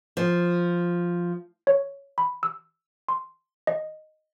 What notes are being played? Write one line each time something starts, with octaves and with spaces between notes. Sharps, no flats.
F3
C#5
B5
E6
C6
D#5